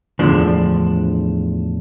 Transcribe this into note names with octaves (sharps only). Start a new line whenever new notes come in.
E2 A2 D3 F3 D4